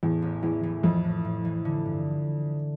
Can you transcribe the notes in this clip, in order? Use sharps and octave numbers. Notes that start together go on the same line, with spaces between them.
E2 A2
A1
E2 E3
E3
F2 E3
A2
A2
E3
D3
G2